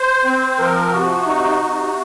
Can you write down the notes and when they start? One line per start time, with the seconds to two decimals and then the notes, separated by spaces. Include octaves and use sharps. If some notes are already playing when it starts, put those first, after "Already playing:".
Already playing: C5
0.25 C4
0.59 F3 A#4
0.92 C3 F#4
1.26 D#4
1.60 C3